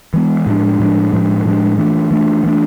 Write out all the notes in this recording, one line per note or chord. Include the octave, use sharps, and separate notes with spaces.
E3 G#3 B3
A2 F3 G#3 D4
A2 F3 G#3 D4
A2 F3 G#3 D4
A2 F3 G#3 D4
E3 A3 D4
E3 A3 D4
E3 A3 D4